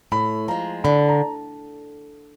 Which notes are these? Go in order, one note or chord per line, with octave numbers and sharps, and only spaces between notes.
A2 B5
F3 G#3 A#5
D3 B5
A#5